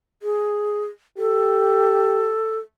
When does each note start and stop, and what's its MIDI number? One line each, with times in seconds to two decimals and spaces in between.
0.22 0.85 68
1.18 2.35 67
1.18 2.58 69